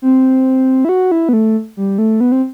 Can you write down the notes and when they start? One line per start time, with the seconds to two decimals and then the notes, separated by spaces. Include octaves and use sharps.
0.02 C4
0.85 E4
0.89 F#4
1.11 E4
1.29 B3
1.33 A3
1.77 G3
1.98 A3
2.20 B3
2.32 C4